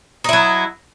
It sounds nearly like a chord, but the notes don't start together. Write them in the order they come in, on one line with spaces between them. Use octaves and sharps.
D#4 E4 F#3